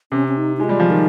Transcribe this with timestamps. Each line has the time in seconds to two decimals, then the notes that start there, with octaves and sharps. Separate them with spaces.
0.12 C3 C#4
0.28 C#4
0.37 D#4
0.57 D#4
0.60 G#3 F4
0.69 G3
0.80 F3
0.90 D#3 D#4